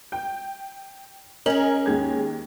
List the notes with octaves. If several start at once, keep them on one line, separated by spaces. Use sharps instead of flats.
G5
C#4 G#4 A#4 D#5 F#7
D#2 G#3 G#6